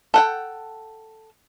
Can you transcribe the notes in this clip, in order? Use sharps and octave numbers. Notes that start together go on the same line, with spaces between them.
A4 F#5 G5